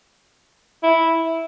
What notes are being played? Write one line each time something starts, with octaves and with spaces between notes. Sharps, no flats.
E4